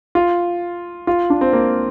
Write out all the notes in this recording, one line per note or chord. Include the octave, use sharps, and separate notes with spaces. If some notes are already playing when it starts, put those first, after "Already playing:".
F4
F4
D4
C4
A#3